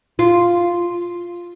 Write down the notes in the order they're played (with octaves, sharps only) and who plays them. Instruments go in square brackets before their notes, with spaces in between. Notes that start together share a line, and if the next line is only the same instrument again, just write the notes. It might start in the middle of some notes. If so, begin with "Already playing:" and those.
[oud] F4